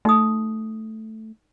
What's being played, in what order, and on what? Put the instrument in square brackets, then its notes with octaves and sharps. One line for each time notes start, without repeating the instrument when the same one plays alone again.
[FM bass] A3 [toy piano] D#4 G4 D#6